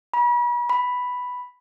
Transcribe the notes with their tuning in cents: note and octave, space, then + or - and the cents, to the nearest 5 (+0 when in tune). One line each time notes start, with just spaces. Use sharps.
B5 -40
B5 +0